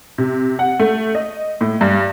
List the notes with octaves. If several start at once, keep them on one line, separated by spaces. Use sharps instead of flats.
C3
F#5
A3
D#5
A2
G2